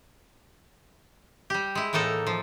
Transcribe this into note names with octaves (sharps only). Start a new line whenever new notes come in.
G3 G4
G#3 E4
A2 E3 A#3 D#4 A4
F3